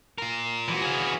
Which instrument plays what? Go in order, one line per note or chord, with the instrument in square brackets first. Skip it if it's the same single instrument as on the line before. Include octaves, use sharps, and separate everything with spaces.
[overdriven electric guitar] F4 A#4
[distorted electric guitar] E3 F#4
[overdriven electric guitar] G#4 F5